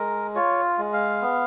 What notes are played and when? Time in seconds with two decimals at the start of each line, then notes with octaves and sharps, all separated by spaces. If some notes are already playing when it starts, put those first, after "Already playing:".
Already playing: G#3 A#4
0.35 F4 C#5
0.78 G#3
0.93 F5
1.22 B3